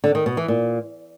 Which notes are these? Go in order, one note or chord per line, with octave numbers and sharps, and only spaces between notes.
D3
D#3
B2
E3
A#2